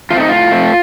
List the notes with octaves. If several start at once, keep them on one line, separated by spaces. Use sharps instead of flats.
A3 C4 F4
D#4
A2 F4
A3 C4